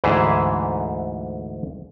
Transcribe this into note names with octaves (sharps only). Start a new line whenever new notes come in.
D2 G#2 E3 G#4 E5